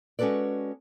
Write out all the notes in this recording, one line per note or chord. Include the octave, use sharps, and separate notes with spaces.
G#3 C#4 F#4 A4 B4 D5